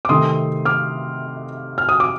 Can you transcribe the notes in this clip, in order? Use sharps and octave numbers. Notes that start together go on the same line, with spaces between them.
D6
C3 D#3 A3 C4 C6 D#6
D6 F6
F6
D#6
D6